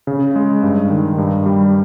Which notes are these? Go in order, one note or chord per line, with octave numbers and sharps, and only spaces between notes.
C#3
G#3
G2
D#3
G2
G3